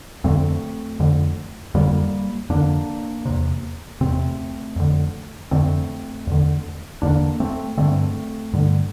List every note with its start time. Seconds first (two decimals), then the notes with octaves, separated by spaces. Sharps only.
0.24 F2 D3 A3 C4
0.99 F2 D3
1.74 F2 D3 G3 A#3
2.50 F2 D3 A#3 D4
3.25 E2 C3
4.01 E2 C3 A3 C4
4.76 F2 D3
5.51 F2 D3 A3 C4
6.27 E2 D3
7.02 E2 D3 A#3 D4
7.40 A3 C4
7.77 G2 D3 A3 C4
8.53 G2 D3